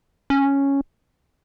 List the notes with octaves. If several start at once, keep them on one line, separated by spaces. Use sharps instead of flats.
C#4